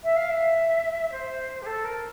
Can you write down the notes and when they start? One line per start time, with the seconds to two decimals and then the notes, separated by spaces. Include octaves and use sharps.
0.04 E5
0.16 F5
0.29 E5
1.12 C5
1.62 G4
1.66 A4
1.84 A#4